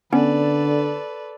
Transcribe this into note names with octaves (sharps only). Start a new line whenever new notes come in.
D3 B3 C#4 A4 B4 D5